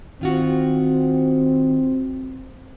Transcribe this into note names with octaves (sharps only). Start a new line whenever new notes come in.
D#3 C4 F4 F#4